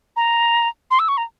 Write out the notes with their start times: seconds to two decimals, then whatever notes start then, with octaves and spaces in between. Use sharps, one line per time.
0.16 A#5
0.91 C6
0.99 E6
1.08 C#6
1.17 A#5